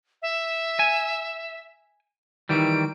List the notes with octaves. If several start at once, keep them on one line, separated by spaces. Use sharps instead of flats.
E5
G#5
D#3 E3 G3 D7